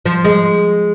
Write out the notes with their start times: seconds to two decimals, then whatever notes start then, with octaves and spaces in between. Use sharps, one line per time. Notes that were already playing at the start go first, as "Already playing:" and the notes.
0.06 F3
0.25 G#3